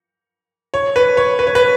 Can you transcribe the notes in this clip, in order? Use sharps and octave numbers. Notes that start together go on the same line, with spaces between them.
C#5
B4
C#5
B4
C#5
B4